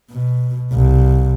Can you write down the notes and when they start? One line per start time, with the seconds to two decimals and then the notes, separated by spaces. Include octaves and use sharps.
0.11 B2
0.74 C2